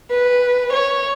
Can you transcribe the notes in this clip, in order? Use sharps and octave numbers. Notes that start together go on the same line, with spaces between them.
B4
C#5